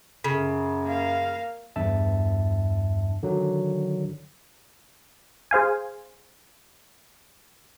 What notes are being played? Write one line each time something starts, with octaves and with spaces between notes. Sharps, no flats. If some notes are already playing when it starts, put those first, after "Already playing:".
F#2 C#3
A#3 F5
E2 G2 E5 A5
D3 D#3 F#3
G#4 C5 F5 G#5